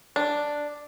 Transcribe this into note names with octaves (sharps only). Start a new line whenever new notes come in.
D4